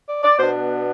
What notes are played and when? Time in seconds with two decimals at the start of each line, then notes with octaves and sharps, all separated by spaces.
0.08 D5
0.24 D5
0.39 B2 B3 D4 C5